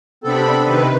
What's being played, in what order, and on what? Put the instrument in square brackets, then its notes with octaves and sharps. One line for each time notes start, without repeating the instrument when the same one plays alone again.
[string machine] C3 D4 B5 [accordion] B3 C4 A4
[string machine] C3 D#3 B4